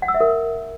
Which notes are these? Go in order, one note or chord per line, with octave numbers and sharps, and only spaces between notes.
F#5
E6
E5
A#4